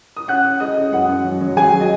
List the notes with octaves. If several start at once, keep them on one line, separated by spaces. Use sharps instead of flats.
D#6
C#4 F#5 F#6
C#4
G#3 D#5 D#6
C#4
F#2 F#5
F#2
F#3
F#3
F#3 G#4 G#5
F#3
D#5